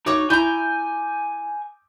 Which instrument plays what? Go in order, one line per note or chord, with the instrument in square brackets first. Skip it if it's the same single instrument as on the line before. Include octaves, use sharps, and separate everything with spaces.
[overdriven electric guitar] D#4 [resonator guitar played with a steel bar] F#4 C#5 [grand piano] D6
[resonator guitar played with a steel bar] E4 A#5 [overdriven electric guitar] G#5 [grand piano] G6